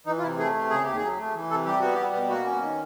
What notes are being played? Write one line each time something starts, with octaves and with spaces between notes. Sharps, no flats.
E3 D#4
F4
C3 E4
A3 G#4
C3
C#3 G#4
D#2 G4
G#4
F#3
A3
E3
C3 A4
G3 G4
B3 F#4
G3 G4
B2
A#3 F#4
C#4
D#3